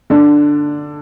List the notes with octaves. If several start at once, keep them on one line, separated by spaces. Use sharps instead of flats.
D3 D4